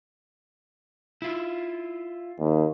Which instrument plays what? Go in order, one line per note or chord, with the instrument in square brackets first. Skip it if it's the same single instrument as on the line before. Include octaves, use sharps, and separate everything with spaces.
[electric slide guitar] E4 F4
[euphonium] D#2